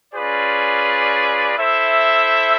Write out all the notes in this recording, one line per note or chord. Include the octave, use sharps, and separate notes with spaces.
C#4 F4 G#4 B4 D5
E4 A4 C5 E5